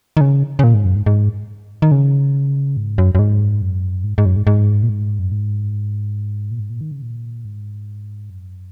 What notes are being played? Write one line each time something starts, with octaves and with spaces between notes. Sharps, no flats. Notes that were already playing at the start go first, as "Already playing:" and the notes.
D#3
C#3
C#3
A#2
G#2
F#2
G#2
G#2
D#3
C#3
G#2
F#2
F#2
G#2
F#2
G#2
G#2
F#2
G#2
G#2
A#2
G#2
F#2
G#2
A#2
G#2
A#2
D#3
C#3
A#2
G#2
F#2